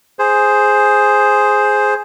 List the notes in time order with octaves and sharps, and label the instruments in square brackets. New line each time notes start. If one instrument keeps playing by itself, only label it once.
[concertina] G#4 C5